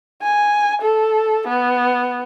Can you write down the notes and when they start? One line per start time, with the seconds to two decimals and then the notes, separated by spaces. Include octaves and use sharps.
0.22 G#5
0.82 A4
1.48 B3